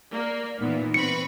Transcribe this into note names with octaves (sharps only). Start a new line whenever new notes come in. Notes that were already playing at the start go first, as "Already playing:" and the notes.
A#3 D5
A#2 E3 B3 D#4
C4 B4 B5 C#6 C#7